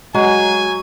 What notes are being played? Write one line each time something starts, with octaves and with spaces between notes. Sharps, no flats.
F#3 G#3 G#5